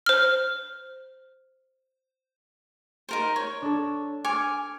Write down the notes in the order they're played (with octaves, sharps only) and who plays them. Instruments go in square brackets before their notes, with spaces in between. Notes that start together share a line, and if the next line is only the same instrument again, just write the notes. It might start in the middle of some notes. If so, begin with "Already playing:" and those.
[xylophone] C5 F6
[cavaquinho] D#4 A#4 C5
C#5
[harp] D4 A4
[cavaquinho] G#5 [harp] C#6 D6 F6